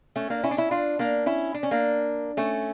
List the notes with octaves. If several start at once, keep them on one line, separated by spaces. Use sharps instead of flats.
A3 C#4
A#3 D4
C#4 E4
D4
C#4 E4
D4 F4
A#3 D4
C#4 E4
D4
C#4
A#3 D4
A3 C#4